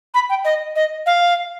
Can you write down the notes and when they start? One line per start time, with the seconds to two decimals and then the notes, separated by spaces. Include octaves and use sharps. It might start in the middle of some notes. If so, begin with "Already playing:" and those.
0.14 B5
0.30 G5
0.45 D#5
0.76 D#5
1.06 F5